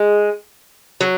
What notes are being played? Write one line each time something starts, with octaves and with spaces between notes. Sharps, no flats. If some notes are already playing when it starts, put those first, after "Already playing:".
Already playing: G#3
F#3